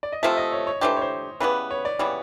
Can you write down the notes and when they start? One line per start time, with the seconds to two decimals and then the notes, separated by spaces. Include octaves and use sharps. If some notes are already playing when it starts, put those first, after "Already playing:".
0.03 D5
0.12 D#5
0.23 C3 F3 A3 E5
0.37 D#5
0.52 C#5
0.67 C#5
0.81 E3 A3 D4 G4 C5
0.97 C#5
1.01 C5
1.40 C#3 E3 G3 B3 B4
1.71 C#5
1.85 D5
1.99 C#3 E3 G3 B3 C#5